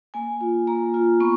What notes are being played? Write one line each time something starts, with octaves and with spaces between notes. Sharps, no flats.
A#3 G#5
F4
A#3 A#5
F4
B3 C#6